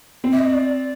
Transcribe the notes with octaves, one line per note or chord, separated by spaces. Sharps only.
C4
E5
D#5
D5